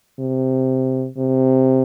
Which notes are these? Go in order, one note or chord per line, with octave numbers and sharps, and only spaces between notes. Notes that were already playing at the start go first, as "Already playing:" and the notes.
C3
C3